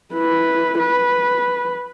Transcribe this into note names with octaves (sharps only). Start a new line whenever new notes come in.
E4 B4
B4